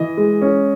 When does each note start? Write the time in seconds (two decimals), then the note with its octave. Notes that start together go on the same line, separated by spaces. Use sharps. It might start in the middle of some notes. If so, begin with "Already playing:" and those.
Already playing: E3 D#5
0.17 G#3
0.42 C#4